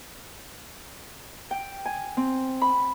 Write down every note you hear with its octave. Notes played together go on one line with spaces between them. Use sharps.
G5
G#5
C4
B5